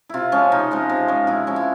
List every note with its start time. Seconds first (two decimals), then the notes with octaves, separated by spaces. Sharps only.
0.09 C3 E4 F4
0.32 F3 G#3 C#4
0.52 C3 D#4
0.71 F3 G#3 C#4
0.89 C3
1.08 F3 G#3 C#4
1.27 C3 E4
1.47 F3 G#3 C#4
1.56 E4